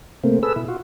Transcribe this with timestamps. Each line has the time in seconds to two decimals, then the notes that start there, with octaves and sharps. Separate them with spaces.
0.24 C3 A3 A#3 C4
0.43 G#4 A4 B4 E6
0.56 B2 E4
0.68 F4 F#4